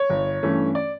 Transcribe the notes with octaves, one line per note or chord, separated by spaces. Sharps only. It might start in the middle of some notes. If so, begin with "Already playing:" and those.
Already playing: C#5
G1
G2 E3 A3 C#4
D5